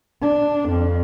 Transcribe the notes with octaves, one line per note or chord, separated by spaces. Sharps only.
D4
F2